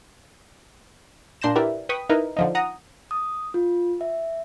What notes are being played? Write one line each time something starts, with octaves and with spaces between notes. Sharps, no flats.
A#2 D4 C6 G6 A#6 E7
E4 G4 A#4 B4 D5 E5
B4 G5 C#6 D#6 B6
D#4 E4 A#4 B4
D3 F3 D#4
F#5 A#5 D#6
D#6
F4
E5